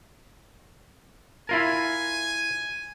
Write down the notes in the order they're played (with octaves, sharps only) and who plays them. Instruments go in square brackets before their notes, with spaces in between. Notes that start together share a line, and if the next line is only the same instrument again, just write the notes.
[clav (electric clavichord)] E4 F4 A#4 [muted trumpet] G#5